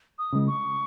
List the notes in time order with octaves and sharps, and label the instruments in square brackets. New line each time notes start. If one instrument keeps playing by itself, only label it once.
[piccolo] D#6
[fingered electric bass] C#3 G#3
[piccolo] C#6